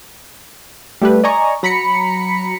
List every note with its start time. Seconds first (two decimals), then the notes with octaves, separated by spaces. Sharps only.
1.01 G3 A3 G4 A4 B4
1.24 D5 D#5 G#5 A#5 C#6
1.63 F#3 A#5 B5 B6 C#7